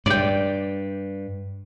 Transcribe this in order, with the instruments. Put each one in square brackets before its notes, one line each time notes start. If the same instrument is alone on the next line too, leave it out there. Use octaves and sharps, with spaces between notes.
[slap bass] G2 [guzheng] D5 G5